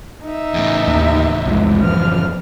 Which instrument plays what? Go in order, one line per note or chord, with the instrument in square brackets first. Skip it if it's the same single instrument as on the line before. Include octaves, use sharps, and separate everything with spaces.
[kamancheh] D#4 E5
[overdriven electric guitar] E2 A2
[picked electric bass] D#2
C2 F2 G#3
[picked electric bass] F#2 E3 F3 [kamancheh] F6